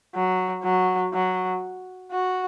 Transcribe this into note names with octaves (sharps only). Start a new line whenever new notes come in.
F#3
F#3
F#3
F#4